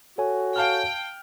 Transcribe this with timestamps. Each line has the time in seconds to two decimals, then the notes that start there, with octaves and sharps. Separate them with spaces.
0.18 F#4 A4 C#5 G#5
0.56 F5 G5 A5 F6